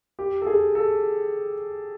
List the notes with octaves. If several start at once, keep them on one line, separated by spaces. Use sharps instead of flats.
G4
A4
G#4
A4